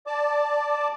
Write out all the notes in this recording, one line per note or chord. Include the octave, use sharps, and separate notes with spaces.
D5 A5 D6